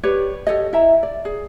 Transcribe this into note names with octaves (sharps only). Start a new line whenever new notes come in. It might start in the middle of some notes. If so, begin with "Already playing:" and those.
G4 B4 C#5 D5
G4 A4 C#5 D#5
E4 E5 A#5
D5
G#4